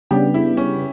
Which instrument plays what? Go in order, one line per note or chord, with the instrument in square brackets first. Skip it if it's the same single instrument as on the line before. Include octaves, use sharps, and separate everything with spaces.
[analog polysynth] C#3 G3 B3 D4 [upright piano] G4
[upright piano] E4
C#4